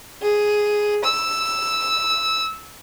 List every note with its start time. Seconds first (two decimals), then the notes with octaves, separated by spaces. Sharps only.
0.22 G#4
1.04 E6